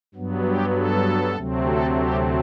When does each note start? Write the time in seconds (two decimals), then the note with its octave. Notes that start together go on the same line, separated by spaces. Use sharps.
0.14 G2 F#3 B3
0.45 G4
0.75 A4
1.35 D2 C3 F#3 A3 C4
1.65 A4
1.96 G4